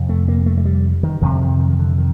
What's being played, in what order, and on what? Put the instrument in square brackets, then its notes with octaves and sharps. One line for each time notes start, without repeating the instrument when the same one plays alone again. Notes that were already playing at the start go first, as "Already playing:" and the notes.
Already playing: [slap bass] F2 C3
A3
A#3
A3
A3
G3
D#3
F2 C3 D#3
D#3
D#3
D#3
D3
D#3